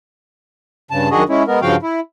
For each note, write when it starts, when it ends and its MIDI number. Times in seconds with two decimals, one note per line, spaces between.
0.91 1.09 43
0.91 1.09 49
0.91 1.09 81
1.11 1.23 42
1.11 1.23 51
1.11 1.23 62
1.11 1.23 66
1.11 1.23 68
1.11 1.23 75
1.29 1.43 56
1.29 1.43 61
1.29 1.43 64
1.47 1.60 56
1.47 1.60 59
1.47 1.60 70
1.62 1.76 43
1.62 1.76 49
1.62 1.76 53
1.62 1.76 66
1.62 1.76 77
1.62 1.76 79
1.83 2.00 64